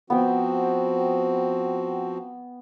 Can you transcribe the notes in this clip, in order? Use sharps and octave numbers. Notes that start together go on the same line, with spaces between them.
F3 B3 C4 F#4 G5